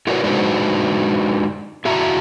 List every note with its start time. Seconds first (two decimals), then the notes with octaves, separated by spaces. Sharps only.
0.07 E4 F#4 A#4 B4 C#5 D5
0.24 G#3 D4 D#4 F#4 B4 C5
1.85 E4 F#4 E5 A5 A#5